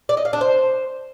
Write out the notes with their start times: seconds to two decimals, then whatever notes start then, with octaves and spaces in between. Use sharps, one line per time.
0.09 D5
0.17 D#5
0.25 F5
0.33 D4
0.41 C5